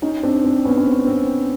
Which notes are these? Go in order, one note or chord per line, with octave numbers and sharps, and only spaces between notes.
C#4 D#4
C4 D4
C4
B3 C#4
C#4
C4
C4